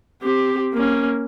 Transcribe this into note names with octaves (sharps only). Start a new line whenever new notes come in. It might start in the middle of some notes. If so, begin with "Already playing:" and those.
C4 G4
A#3 C#4